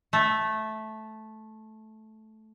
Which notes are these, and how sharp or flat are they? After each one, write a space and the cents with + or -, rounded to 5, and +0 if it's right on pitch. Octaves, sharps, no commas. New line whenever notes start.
A3 -10